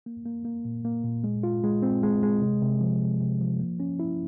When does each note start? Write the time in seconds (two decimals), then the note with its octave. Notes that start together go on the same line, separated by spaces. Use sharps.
0.06 A#3
0.26 A#3
0.45 A#3
0.65 A#2
0.84 A#3
1.04 A#2
1.24 G#3
1.43 F4
1.64 G#3
1.82 C4
2.03 G#3
2.23 G#3
2.41 C3
2.62 C3
2.81 F3
3.02 C3
3.21 C3
3.41 F3
3.60 A#3
3.80 C#4
4.00 E4